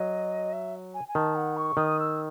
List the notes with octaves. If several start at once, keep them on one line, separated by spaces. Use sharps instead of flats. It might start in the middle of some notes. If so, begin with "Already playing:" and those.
Already playing: F#3 D#5
E5
G#5
G#5
D#3 A5
F#5
C#6
D#3 D#6
E6